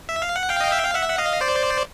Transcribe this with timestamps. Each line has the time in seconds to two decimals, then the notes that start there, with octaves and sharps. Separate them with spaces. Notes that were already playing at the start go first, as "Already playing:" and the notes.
0.09 E5
0.22 F5
0.36 F#5
0.49 F5 G5
0.61 D#5
0.72 E5
0.84 F5
0.95 E5 F#5
1.09 F#5
1.18 D#5 F5
1.41 C5 D5